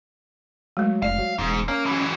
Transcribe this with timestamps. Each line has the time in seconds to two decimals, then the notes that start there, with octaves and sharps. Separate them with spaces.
0.77 F#3 G#3 A3
1.02 F1 D5 F5
1.19 F#3
1.38 E1 G#2
1.68 A#3 C#4
1.86 E3 F#3